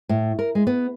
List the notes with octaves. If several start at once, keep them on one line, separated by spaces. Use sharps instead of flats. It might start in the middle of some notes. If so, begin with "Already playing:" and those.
A2
A#4
G#3
B3